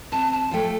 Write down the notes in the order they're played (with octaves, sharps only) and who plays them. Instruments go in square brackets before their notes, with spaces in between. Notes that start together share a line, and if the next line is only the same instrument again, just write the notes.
[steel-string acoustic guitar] C3 [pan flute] A5
[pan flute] A5
[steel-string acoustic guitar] F3 A3 [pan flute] G5